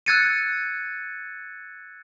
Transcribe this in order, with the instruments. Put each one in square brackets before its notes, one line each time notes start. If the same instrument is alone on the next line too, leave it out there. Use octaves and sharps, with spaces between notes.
[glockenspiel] E6 F#6 G#6 A6 C#7 D#7